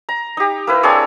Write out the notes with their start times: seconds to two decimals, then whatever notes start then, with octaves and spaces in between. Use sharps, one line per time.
0.09 A#5
0.37 D#4 G4
0.67 A#3 E4 B4
0.83 C4 D4 G#4 C#5